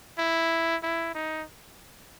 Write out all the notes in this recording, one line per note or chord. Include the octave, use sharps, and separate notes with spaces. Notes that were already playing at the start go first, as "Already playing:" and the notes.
E4
E4
D#4